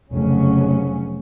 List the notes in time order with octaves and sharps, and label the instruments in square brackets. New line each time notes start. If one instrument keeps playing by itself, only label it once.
[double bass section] F1 C#3 F#3 C#4